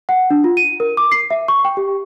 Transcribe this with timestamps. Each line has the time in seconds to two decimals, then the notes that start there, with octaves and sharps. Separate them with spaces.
0.09 F#5
0.30 D4
0.44 F4
0.57 D#7
0.80 A#4
0.97 D6
1.12 C7
1.30 E5
1.48 C#6
1.65 G5
1.77 G4